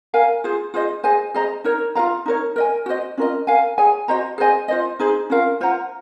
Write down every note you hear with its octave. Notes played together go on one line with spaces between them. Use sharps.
A#4 F5 G#5
F4 G#4 C5
F4 G#4 C5 D#5
G#4 C5 D#5 G#5
G#4 C5 D#5 A#5
D#4 A#4 C#5
F4 A#4 F5 A#5
D#4 A#4 C#5
A#4 D#5 G#5
F#4 C5 D#5
C#4 F4 A#4 D#5
A#4 F5 G#5
G#4 C#5 G#5
F#4 C5 D#5 A#5
G#4 C5 D#5 G#5
F4 C5 D#5
D#4 G#4 C5
C#4 F4 A#4 F5
F4 C5 F#5 A#5